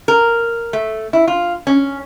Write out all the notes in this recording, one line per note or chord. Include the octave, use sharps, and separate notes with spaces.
A#4
A3
E4
F4
C#4